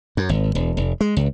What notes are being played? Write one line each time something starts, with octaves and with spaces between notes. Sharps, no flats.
F#2
G#1
E1
F1
G#3
C#2